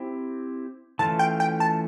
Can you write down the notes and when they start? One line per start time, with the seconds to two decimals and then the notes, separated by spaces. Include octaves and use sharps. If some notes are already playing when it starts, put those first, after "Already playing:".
Already playing: C4 E4 G4
0.99 E3 A3 C#4 F4 A5
1.19 G5
1.40 G5
1.60 A5